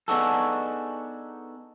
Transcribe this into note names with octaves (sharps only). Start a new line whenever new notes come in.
B3 D4 D#4 F#4 G#4 A4